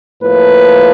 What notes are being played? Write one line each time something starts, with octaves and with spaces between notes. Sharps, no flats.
A2 F3 A#3 B4